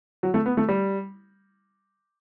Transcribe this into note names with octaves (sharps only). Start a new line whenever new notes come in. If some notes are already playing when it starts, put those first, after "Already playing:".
F#3
A3
B3
A3
G3